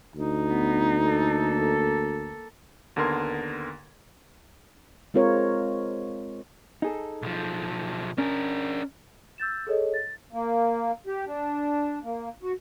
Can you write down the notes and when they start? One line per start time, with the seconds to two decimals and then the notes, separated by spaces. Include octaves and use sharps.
0.16 D2 D#4
0.49 B3
1.06 A#3 A4
2.96 D#2 D3 B3 A#4 C6 G#6
5.14 G#3 C4 F4 A#4 C#5
6.82 D#4 G#4 A4
7.22 B1 F3
8.18 C#4 D4 A#4
9.38 E6 G6 A6 E7
9.67 G#4 A4 C#5 D#5
9.94 A6
10.33 A#3
11.07 G4
11.27 D4
12.04 A#3
12.42 F#4